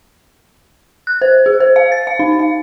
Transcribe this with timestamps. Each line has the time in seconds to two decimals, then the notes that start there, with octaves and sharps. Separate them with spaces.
1.07 F#6
1.22 C5
1.46 G#4
1.60 C5
1.76 F5
1.92 A6
2.07 F5
2.19 D#4
2.39 F5